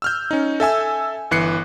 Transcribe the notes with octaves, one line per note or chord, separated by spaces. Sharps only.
E6 F6 G6
C#4 D#4
A4 E5 G#5 E6
G1 E3 F#6 C7 C#7